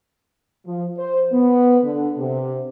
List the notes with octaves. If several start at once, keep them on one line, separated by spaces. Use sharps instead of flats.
F3
C5
B3
D3
C3